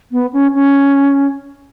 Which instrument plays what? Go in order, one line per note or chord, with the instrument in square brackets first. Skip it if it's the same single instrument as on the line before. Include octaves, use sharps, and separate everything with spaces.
[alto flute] B3
C#4
C#4